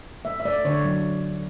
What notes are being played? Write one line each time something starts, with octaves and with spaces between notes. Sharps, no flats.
A3 E5
E5
A3 D5
D3 C#5
F#3